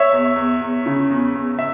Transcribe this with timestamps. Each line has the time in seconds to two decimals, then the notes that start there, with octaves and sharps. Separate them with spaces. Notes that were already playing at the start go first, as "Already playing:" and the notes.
Already playing: C#5 E5
0.13 E2
0.36 E2
0.61 E2
0.86 C#3
1.10 E2
1.35 E2
1.59 E5